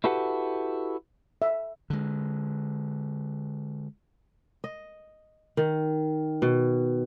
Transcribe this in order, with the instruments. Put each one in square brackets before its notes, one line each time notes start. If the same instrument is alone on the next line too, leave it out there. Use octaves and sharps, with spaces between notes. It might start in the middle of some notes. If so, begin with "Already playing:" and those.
[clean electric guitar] E4 F#4 G4 A4 B4 F#5
[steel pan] E5
[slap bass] D3 G#3
[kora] D#5
D#3
B2